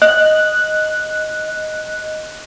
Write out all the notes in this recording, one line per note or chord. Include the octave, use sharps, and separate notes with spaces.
D#5 F#6